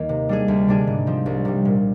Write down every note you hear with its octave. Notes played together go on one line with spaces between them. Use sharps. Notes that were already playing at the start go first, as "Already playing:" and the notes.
Already playing: D#2 D#3 A#3
C3
G3 D4 G#4
D2
C3 G3 D4 G#4
G#2
F3 C4
C2
C3 G3
A#2